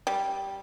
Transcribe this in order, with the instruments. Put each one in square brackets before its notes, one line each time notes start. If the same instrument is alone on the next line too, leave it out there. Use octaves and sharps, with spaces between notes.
[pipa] G3